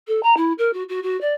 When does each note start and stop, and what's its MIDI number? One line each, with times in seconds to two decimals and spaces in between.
0.08 0.22 69
0.23 0.34 82
0.37 0.53 64
0.58 0.73 70
0.73 0.83 66
0.89 1.02 66
1.03 1.19 66
1.21 1.33 74